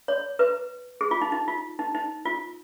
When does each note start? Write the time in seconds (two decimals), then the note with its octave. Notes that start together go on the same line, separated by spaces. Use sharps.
0.08 C#5
0.39 B4
1.01 G#4
1.11 F4
1.22 D#4
1.32 D#4
1.48 F4
1.79 D#4
1.95 D#4
2.25 F4